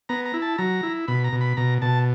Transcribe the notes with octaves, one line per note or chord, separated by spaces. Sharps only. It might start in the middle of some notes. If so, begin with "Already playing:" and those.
B3 A#5
A#5
E4
A5
F#3 A#5
E4
B2 B5
A#5
B2
B5
B2 A#5
B2 A5